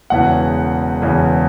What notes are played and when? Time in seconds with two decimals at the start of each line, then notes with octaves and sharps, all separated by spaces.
0.10 E1 E2 C#3 E3 F#5
1.02 E1 E2 C#3 E3